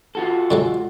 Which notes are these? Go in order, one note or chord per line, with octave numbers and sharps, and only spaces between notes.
F4 F#4 A4
D3 F#3 G#3